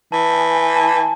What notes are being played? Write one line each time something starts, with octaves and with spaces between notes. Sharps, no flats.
E3 A5
G#5
G#5
A5